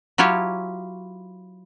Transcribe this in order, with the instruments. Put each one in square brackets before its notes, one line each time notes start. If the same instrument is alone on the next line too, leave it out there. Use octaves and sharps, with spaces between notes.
[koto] F#3 E4 F4 G4 C#5